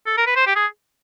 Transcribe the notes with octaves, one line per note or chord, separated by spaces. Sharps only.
A4
A#4
B4
C5
G4
G#4